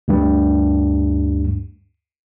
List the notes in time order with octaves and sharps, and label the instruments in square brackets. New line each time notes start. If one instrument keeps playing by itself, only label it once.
[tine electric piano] D2 G2